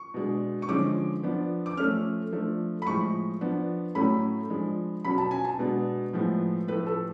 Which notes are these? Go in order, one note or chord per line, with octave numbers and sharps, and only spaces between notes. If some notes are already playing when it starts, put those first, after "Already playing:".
Already playing: C#6
B2 G#3 D4
C#6
D3 F3 G#3 C#4 D6
F3 B3 D4
D6
F3 A3 C#4 F6
F3 A3 D4
B5
A2 F3 G#3 C#6
F3 B3 D4
A2 F#3 A3 C#4 B5
F3 G#3 D4
B2 F#3 C#4 B5
A5
G#5
A5
B2 G#3 B3 D4
A2 F3 G#3 B3
A2 F3 A3 B4
A4